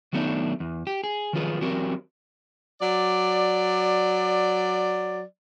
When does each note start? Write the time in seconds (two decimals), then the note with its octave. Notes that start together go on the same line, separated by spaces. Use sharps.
0.13 D#3 F#3 A3 B3 D4 D#4
0.60 E2
0.87 G4
1.04 G#4
1.33 D#3 F3 F#3 F4 G#4 B4
1.61 E3 F#3 C4 F#4 G4 A#4
2.80 F#3 D5